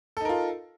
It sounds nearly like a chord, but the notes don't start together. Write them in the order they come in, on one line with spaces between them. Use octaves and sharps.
A4 D#4 A#4 F4